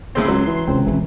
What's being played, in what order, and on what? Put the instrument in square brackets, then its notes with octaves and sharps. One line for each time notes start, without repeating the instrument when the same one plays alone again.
[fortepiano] A2 C#3 C4 [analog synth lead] C6
[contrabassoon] C#2 [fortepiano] F#3
[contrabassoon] E3
[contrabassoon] C#2 [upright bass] C3 D#3 [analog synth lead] C4
[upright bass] B2 C4 [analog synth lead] E3